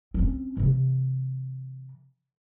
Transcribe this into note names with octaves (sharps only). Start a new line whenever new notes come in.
C4 C#4
C3 E3